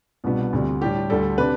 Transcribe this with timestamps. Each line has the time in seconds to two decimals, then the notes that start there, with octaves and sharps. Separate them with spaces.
0.24 C2 B2 G3 B3 D4 F4
0.53 D2 C3 G3
0.81 A2 G3 D4 G4
1.10 D2 D3 G3 A4
1.38 C3 G3 D4 B4